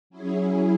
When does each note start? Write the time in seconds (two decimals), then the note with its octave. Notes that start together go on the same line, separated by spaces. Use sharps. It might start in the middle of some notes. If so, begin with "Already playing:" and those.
0.10 F#3 C#4 E4 G#4